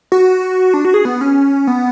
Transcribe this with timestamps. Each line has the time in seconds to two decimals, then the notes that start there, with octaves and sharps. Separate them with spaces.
0.12 F#4
0.74 D4
0.85 F#4
0.94 G#4
1.05 B3
1.21 C#4
1.67 B3